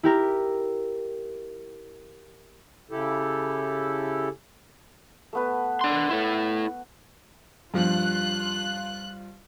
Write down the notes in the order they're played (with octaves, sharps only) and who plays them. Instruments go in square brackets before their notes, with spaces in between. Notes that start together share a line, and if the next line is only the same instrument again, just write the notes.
[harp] E4 G4 A#4
[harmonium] C#3 E4 G4 A4
[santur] A3 B3 B4
[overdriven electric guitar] D4 C6
E4 A4
[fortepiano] G2 F3 [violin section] F4 F#6